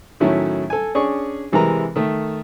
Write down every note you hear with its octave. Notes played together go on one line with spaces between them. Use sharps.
A2 D#3 F#3 A3 C#4 E4
A4 G#5
C#4 D4 G#4 C#6
C3 E3 G#3 A#4 B4 A#5
D#3 A3